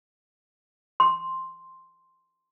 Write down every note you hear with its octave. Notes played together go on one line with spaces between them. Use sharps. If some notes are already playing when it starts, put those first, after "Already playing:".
C6